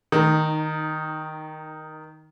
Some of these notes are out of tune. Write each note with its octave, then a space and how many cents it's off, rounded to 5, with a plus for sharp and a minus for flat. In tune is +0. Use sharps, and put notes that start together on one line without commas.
D#3 +5 D#4 -15